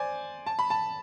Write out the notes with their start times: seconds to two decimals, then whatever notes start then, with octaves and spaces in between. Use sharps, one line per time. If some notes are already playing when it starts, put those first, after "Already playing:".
Already playing: C5 D5 G#5
0.46 A5
0.59 B5
0.70 A5